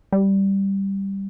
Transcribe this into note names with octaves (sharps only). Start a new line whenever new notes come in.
G3